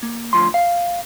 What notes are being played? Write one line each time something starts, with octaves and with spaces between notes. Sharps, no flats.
A#3
D2 F3 C6
F5